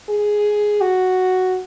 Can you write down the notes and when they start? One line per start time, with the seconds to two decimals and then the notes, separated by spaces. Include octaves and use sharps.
0.09 G#4
0.81 F#4